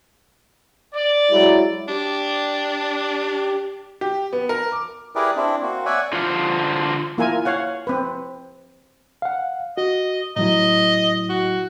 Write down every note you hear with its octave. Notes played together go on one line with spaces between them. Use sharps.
D5
F#3 G#3 E4
D4 G4
G4
B3
A#4
D6
E4 G4 G#4 A#4 B4 D5
C4 D4 E4
A#3 C4 F#4
C#5 D5 E5 F#5 G#5
D3 F4 C5 F5 F#5
A#3 E4 F4 A#4 G#5
C#5 F5 F#5
C4 B4
F5 F#5
F#4 D#5
A2 F#3 E4 D#5
F#4